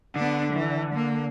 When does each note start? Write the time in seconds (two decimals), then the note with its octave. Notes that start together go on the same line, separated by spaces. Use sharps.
0.16 D3 B3 D4
0.53 E3
0.94 A#3